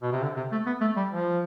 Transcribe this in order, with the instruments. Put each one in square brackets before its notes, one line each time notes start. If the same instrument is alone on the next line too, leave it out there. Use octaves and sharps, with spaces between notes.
[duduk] B2
C3
D3
C3
A3
B3
A3
G3
F3